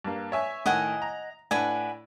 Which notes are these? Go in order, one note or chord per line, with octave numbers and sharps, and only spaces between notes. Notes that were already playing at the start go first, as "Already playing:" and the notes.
G2 A#3
C#5 E5 G#5
A2 D#3 D#5 F#5 G#5
A#5
A2 D4 B4 F#5 G#5